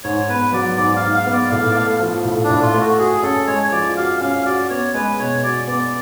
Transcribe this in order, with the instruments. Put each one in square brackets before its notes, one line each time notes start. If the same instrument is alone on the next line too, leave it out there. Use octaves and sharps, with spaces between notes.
[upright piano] G#2 [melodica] C#5
[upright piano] B3 [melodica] B4
[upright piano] F#3 [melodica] D5
[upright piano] G#2 [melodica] D5
[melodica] F5
[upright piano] G#2
[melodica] F5
[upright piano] B3
[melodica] D5
[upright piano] A2 [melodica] F5
[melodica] D5
[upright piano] A3 [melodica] F5
[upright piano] F3
A2
[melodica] D4
[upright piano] A2
[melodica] F4
[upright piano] A3
[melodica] F#4
[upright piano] F#4 [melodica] G#4
[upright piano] C#4 [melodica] A4
[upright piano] G#3 [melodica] C#5
[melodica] C#5
[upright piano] F3 [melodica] D5
[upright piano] F#4 [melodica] F5
[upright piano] C#4 [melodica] F5
[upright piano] F#4 [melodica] D5
[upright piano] B3 [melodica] C#5
[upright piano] G#3 [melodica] B4
[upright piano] B2 [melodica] C#5
[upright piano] F#4 [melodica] D5
[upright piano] B3 [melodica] D5